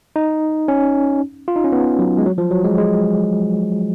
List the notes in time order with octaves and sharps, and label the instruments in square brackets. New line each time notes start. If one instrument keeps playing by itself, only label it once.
[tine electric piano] D#4
C#4
F4
D#4
C#4
B3
F#3
G#3
F#3
F3
F#3
G#3
G#3